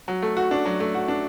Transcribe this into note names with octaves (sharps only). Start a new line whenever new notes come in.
F#3
A3
F#4
D4
F#3
A3
F#4
D4